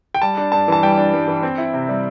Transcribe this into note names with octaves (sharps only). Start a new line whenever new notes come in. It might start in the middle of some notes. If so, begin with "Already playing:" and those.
G5
G3 A5
D4
G2 A5
E3 A5
G3 G5
D4
G2
E3
C4
E4
C3
G3